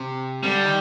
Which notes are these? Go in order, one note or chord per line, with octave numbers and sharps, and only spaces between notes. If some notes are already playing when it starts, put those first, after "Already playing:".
Already playing: C3
D3 G3
D#3